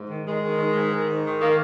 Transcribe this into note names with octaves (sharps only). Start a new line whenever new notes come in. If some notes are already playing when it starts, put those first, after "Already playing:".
Already playing: G#2
D#3
D#3 G#3
D#3
D#3
G#2
D#3
G#2
D#3
D#3 A#3